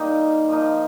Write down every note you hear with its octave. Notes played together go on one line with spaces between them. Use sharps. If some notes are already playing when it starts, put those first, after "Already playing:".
Already playing: D#3 G3 A#3 D#4
F3 A#3 D#4